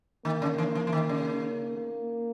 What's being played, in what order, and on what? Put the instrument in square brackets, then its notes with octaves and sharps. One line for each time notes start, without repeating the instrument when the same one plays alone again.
[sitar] D#3 [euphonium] A#3
[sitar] C#3
E3
E3
E3
D#3
C#3
[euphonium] A#3